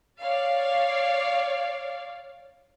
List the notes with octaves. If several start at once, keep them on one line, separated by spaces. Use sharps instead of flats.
C#5 D5 F5